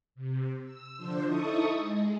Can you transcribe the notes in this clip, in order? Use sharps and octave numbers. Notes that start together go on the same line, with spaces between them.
C3
E6
D3 F3 D4 C5
D#4 E4 A4 C#6 D#6
G#3